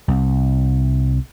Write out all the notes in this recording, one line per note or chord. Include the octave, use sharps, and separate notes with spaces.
C2